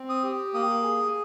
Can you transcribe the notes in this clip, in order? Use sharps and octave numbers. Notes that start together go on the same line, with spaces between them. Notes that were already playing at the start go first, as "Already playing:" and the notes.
Already playing: C4
D#6
G4
A#3 D#6
G#4